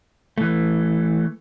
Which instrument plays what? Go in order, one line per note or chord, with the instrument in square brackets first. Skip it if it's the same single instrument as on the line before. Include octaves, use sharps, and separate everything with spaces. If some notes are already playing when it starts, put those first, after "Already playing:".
[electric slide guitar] E3 A3